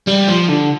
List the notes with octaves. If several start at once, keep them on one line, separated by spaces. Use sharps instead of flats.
G3
F3
D3